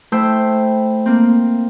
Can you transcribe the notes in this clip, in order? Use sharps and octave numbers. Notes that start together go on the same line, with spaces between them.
A3 E4 C5 G5 E6
A#3 C4